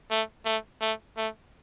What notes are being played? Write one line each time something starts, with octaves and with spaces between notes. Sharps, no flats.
A3
A3
A3
A3